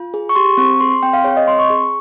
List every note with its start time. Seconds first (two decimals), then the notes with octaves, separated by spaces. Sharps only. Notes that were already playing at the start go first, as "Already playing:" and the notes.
Already playing: F4
0.14 G#4
0.29 C#6
0.35 G4 C6
0.57 C4 C#6
0.80 G#4 C6
0.91 C6
1.03 C4 G5
1.13 F5
1.24 G#4 C#5
1.37 D#5
1.48 C4 C6
1.59 C#6
1.70 G#4